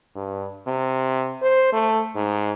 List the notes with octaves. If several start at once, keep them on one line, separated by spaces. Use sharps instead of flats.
G2
C3
C5
A3
G#2